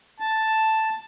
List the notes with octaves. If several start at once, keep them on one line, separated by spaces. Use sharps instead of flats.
A5